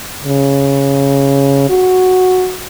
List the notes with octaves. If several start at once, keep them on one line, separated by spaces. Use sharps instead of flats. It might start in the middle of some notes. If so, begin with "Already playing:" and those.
C#3
F#4